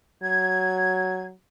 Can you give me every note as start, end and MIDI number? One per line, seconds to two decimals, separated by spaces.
0.22 1.33 54
0.22 1.22 92